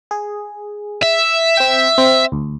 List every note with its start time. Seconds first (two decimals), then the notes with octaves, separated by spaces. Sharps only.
0.11 G#4
1.03 E5
1.57 C4 G5
1.98 C4
2.32 D2